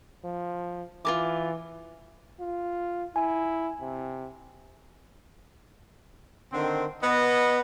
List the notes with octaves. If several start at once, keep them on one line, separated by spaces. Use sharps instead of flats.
F3
E3 F4 A#4 D6
F4
E4 G#5
C3
D3 D#3 C4
B3 D#5